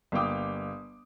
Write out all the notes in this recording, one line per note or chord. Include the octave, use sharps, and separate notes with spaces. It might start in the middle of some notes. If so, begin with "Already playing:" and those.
G1 A#3 F5 G5 D6 D#6